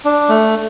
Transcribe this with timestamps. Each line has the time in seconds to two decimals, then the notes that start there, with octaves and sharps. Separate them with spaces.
0.05 D4
0.29 A3